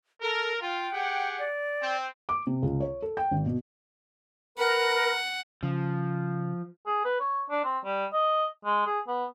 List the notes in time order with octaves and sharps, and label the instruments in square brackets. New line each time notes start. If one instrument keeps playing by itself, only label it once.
[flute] A4 [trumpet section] A#4
[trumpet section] F4 [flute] G5
[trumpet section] G4 G#4 F#5
[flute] D5
[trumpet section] C4 G5
[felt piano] D6
C3
C#2
C#5
A4
G5
G#1
B2
[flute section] A#4 [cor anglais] B4 [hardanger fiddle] F#5
[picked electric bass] C#3 [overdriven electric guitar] F3
[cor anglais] G#4
B4
C#5
D4
C4
G3
D#5
G#3
G#4
B3